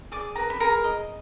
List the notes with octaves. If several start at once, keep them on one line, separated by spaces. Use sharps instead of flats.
G#4 D5 D6
A#4 B4 A#5
B5
G#4 A#4 A#5
D#5